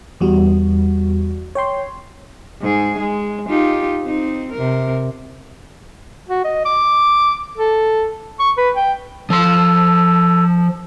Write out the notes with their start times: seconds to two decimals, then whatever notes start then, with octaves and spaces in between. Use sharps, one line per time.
0.21 E2 G3 F#4
1.55 C#5 G5 C6
2.61 G#2 G#4
2.99 G#3
3.49 D#4 F4 G4
4.03 C4 D#4
4.52 C3 A#4
6.29 F#4
6.45 D#5
6.65 D6
7.58 A4
8.39 C#6
8.58 B4
8.76 G5
9.30 F3 A4 C6